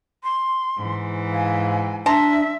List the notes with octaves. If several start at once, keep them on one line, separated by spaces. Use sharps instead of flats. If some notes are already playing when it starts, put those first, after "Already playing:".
C6
G#2 E3
F5 G#5
D4 E5 A5 A#5 C6